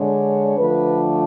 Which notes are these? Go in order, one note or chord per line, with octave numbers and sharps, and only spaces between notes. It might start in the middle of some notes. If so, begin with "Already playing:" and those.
Already playing: D3 G#3 D4 C#5
D3 F3 A3 D4 B4